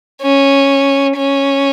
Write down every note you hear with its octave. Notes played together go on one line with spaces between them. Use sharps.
C#4
C#4